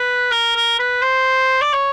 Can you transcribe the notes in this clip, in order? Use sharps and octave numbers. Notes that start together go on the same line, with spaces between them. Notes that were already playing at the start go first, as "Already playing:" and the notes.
Already playing: B4
A#4
A#4
B4
C5
D5
C#5